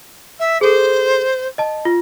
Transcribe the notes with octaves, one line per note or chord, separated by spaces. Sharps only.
E5
G#4 A4 C5
D#5 A5
F4